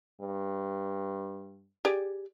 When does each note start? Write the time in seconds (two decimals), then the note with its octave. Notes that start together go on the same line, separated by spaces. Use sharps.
0.21 G2
1.85 G4 G#4 D5